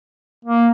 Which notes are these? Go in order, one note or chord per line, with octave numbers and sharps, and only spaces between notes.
A#3